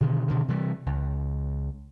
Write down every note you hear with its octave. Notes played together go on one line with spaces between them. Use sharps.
B2 D3 D#3
B2 D3 D#3
C3 E3 G3
C#2